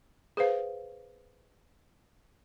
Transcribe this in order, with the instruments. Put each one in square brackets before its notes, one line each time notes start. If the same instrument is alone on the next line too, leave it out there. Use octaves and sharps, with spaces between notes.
[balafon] G#4 B4 C5 F5